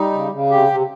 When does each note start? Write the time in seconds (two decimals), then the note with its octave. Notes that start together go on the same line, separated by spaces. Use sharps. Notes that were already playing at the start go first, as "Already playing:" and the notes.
Already playing: G3 D#4
0.12 C#3
0.31 C#3
0.50 C3 G4
0.68 C3